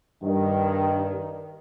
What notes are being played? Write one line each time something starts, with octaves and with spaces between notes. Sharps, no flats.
G2 D#3